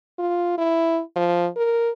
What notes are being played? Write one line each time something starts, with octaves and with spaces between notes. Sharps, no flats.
F4
E4
F3
A#4